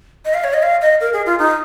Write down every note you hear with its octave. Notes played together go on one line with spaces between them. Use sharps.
D#5
F5
C#5
D#5
F5
D#5
A#4
G#4
F4
D#4